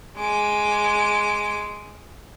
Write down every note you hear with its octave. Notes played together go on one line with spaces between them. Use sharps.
G#3 D6